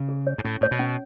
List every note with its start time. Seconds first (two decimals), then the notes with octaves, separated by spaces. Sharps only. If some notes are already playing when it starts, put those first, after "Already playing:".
Already playing: C#3
0.09 G#4
0.27 C#5
0.38 G#2
0.44 A2 C#4
0.61 A2 C#5
0.71 B2
0.80 C#4